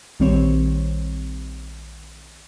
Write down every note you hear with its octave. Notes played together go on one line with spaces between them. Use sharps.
A#1 D#3 G3 C4 C5 C#5